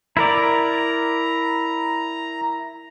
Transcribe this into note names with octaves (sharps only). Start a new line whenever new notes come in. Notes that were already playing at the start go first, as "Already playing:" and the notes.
E4 A#4 D5 A#5